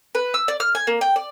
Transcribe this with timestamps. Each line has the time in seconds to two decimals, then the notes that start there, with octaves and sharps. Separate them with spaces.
0.15 B4
0.34 E6
0.48 D5
0.60 F6
0.75 G#5
0.87 A#3
1.01 G5
1.16 D5